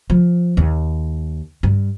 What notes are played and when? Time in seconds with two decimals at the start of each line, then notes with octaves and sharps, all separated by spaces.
0.10 F3
0.57 D#2
1.63 G2